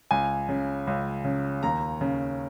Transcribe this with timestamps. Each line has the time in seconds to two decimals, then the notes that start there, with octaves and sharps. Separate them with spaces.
0.11 C#2 G#5
0.49 C#3
0.87 C#2
1.25 C#3
1.63 D#2 A#5
2.01 C#3